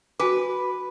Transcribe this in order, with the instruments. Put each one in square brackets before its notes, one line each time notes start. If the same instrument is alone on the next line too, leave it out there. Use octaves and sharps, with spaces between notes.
[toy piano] F#4 G#5 D6 [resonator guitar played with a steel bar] B4